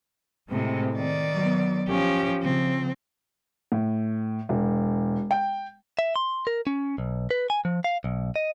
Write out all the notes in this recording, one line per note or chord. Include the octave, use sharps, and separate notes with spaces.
A2 C3 G#3 C4
D#3 D5
F#3 B3
F3 C#4 G4
C#3 F3 C4
A2
E1
G5
E5
C6
A#4
C#4
B1
B4
G#5
F3
F5
B1
D#5